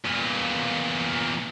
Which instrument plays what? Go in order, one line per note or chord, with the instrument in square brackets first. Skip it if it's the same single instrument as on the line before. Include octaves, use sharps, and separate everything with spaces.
[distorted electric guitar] E2 A#2